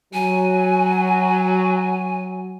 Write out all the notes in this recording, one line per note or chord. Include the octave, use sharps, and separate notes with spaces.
F#3 G#5